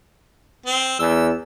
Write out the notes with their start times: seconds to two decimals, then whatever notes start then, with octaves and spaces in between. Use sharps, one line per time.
0.66 C4
0.99 E2 E6